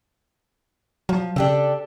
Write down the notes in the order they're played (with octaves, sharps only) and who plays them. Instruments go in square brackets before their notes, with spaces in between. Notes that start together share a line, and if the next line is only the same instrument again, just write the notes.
[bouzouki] F3 [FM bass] F#3
[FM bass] C#3 [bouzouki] D4 G4 A4